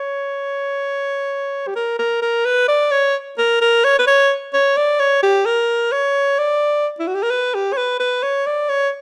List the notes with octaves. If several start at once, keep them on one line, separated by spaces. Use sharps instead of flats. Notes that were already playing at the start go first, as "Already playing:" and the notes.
Already playing: C#5
G4
A#4
A#4
A#4
B4
D5
C#5
A#4
A#4
C#5
B4
C#5
C#5
D5
C#5
G4
A#4
C#5
D5
E4
F#4
G4
A#4
B4
G4
C#5
B4
B4
C#5
D5
C#5